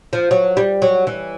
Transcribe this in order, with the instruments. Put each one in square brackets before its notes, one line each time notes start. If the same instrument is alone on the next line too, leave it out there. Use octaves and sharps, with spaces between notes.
[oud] F3
F#3
G3
F#3
E3